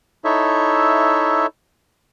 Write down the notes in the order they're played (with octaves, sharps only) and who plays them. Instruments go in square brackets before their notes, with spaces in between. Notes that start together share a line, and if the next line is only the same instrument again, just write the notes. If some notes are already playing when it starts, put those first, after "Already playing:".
[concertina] D#4 E4 A4 C#5 E5